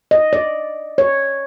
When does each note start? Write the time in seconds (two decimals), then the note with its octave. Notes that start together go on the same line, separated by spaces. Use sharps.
0.11 D#5
0.33 D5
0.98 C#5